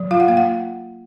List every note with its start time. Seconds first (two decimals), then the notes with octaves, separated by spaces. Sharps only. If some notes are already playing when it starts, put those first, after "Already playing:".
Already playing: F#3
0.11 F4 F5
0.20 F#5
0.28 A#3 F5
0.37 F#5